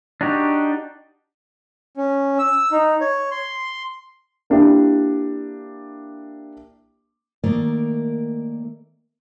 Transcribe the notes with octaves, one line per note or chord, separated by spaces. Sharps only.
D4 D#4 F#4 G4
C#4
E6
D#4
C#5
C6
A#3 D4 E4 G4
D#3 A3 A#3 A#4 D5